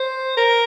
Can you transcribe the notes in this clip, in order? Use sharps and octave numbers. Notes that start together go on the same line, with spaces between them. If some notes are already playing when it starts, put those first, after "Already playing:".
Already playing: C5
A#4